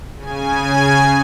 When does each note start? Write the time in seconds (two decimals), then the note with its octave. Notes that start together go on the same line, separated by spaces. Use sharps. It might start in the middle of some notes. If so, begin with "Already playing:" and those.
0.15 C#3 G#5